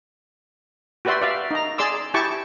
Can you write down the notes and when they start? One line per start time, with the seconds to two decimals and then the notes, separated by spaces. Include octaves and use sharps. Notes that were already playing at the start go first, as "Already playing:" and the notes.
1.05 F#4 G4 B4 D5 E5 C6
1.22 D5 E5 F5
1.51 D#4 A#5
1.78 G#4 D5 C6 D6 E6
2.14 E4 G4 A5 C#6 D6